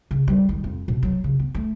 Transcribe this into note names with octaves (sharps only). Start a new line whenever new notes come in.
C#3
G3
D#3
F2
B2
F#3
C#3
B3
A3